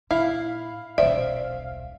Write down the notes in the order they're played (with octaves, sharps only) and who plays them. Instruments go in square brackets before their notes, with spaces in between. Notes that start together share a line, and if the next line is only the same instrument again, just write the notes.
[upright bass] A#2 [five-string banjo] E4 [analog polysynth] F5
[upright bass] D#1 B1 [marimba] C5 D5 [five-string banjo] E5